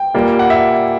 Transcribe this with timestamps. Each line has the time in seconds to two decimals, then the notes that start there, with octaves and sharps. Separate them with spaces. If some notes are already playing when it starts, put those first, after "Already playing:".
Already playing: G5
0.14 A#2 G3 A#3
0.39 F#5
0.50 E5